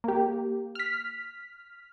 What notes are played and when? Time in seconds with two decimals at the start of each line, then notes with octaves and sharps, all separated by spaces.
0.04 A#3 G4
0.75 F6 B6